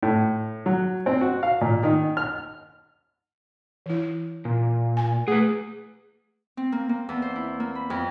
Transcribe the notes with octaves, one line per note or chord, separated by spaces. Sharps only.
A2
F#3
C4
F#4
F5
A#2
D#3
F6
E3 E4
A#2
G#5
A3 G#4 B4
C4
A#3
A#3
E2
C5
E4
A#3
B5
F2